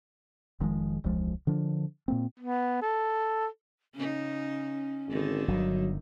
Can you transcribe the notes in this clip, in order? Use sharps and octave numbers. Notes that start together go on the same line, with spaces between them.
F1 D#3 F3 G#3
E1 C#2 F3 G#3
D3 F3 D4
A#2 A#3 C4
B3
A4
C#3 C#4 D#4
G#1 D3 D#3 D#4
G1 F#3